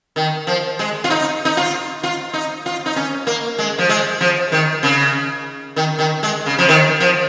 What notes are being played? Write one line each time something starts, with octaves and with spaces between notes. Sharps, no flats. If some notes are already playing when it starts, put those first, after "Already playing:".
D#3
F3
G#3
F4
D#4
D#4
F4
F4
D#4
F4
D#4
C#4
A#3
G#3
F3
G#3
F3
D#3
C#3
D#3
D#3
G#3
C#3
F3
D#3
F3